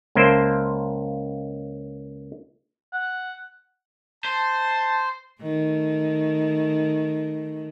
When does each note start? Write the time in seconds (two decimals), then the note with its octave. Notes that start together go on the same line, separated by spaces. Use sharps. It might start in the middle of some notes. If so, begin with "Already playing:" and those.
0.15 C#2 A#3 C5 E5 G5 A5
2.93 F#5
4.25 C5 A5
5.42 D#3 A3